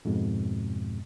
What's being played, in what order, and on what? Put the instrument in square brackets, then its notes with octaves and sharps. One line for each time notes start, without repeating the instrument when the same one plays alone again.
[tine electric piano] F2 G#2 B2 G#3